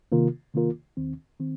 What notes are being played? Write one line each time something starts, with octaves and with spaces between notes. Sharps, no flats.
C3 D#3 A#3 F4 A#4
C3 D#3 A#3 F4 A#4
D#2 D#3 C4
D#3 C4